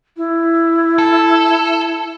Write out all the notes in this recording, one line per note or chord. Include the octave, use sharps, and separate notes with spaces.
E4
A4